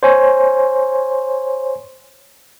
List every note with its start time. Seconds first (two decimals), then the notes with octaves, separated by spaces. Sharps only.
0.03 C5 C#5 G#5